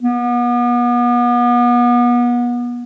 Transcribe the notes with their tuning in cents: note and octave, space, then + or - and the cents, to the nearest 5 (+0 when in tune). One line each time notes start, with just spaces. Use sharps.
B3 -35